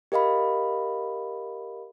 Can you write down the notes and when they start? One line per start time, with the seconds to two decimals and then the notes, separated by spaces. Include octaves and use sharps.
0.12 G4 A#4 D#5 F5 B5